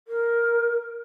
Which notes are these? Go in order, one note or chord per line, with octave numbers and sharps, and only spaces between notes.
A#4